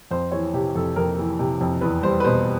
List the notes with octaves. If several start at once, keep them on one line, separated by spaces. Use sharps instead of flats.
F2 C5
E3 C#5
C3 G4
F2 A4
F2 A#4
E3
C3
F2
E2 B4
G3 C5
B4
B2 C5